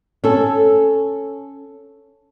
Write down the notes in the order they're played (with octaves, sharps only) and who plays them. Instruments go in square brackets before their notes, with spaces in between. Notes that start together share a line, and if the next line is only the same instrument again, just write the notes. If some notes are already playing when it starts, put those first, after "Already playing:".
[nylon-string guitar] C#4 A4